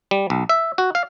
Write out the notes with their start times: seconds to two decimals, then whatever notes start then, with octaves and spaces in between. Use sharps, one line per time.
0.11 G3
0.30 B1
0.49 E5
0.78 F#4
0.95 F5